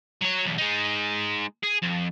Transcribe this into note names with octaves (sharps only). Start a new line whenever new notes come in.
F#3 C#5
B1 E2
G#3 D#4
G#4
F2